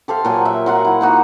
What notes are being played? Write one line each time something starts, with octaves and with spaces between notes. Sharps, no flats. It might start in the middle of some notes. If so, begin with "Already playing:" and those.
G4 A4 C5 F5
A#2 F#3 G#5
E5
F#3 F4 F#5
E4
A#3 D#4 F#4